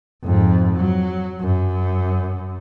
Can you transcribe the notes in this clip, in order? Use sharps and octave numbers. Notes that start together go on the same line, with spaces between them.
F2 G#2
F#3
F#2